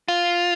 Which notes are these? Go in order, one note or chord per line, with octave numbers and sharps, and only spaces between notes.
F4